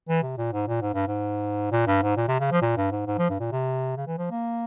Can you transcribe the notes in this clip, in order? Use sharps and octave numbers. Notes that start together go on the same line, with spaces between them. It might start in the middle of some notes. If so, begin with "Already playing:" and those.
E3
C3
A#2
G#2
A#2
G#2
G2
G#2
A#2
G2
G#2
A#2
C3
C#3
F3
A#2
G2
G#2
G#2
F3
G2
A#2
C3
C#3
E3
F3
A#3